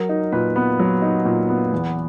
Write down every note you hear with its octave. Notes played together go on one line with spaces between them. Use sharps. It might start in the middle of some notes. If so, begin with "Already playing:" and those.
Already playing: F#3 A#4
D#4
A#2 B4
B3
F#3
D#4
A#2
B3
E2